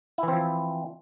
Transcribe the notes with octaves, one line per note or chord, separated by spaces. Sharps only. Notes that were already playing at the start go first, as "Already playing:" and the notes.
E3 F3 C4 E4